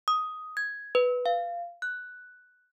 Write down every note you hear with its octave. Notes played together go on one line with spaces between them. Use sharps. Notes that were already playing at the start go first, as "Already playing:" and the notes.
D#6
G#6
B4
F5
F#6